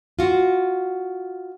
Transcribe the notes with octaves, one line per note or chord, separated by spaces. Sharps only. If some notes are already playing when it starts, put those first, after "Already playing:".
F4 F#4